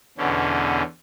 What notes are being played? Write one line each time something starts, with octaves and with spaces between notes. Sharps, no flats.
E2 B2 D3 C#4